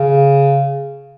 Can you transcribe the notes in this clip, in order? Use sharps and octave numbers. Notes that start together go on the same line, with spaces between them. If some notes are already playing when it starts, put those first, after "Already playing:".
Already playing: C#3